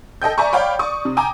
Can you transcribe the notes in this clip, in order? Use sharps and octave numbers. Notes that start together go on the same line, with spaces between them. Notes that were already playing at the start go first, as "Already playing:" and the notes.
A4 D#5 G5 G6
D5 E5 G#5 A#5 C#6
C#5 D5 F5 G5 B5
D5 C#6 D#6
C3
G5 G#5 A#5 D6